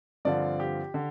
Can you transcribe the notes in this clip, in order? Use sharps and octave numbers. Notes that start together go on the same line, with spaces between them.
G2 D3 F3 C4 F4 D5
G4
D3